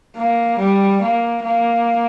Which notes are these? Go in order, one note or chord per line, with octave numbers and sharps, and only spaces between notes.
A#3
G3
A#3
A#3